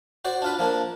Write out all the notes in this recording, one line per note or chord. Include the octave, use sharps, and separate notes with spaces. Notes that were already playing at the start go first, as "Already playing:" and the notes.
F#4 C5 D5
D4 F4 B4
F3 A#3 D4